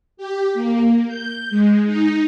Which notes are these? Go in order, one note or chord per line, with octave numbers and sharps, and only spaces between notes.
G4
A#3
G6
G#3
D#4